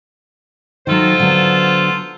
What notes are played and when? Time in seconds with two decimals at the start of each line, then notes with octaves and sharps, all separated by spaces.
0.87 D#3 F#3 F4 A4 C5
1.20 D3 F#3 B3